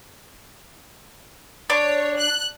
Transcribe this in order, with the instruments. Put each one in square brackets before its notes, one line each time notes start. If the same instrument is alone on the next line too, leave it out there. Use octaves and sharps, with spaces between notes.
[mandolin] D4 [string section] C#5
[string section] F#6